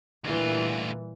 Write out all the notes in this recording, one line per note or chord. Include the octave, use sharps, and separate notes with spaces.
D2 A#2 E3 G3 F4